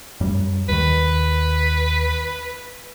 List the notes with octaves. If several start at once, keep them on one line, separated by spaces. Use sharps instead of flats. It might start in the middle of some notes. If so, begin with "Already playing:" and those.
F#2 F#3 G3
D#2 D#3 B4